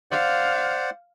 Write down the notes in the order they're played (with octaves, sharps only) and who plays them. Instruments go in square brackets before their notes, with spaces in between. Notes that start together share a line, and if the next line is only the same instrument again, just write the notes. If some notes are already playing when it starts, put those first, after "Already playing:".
[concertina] C5 D5 F#5 [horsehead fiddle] F5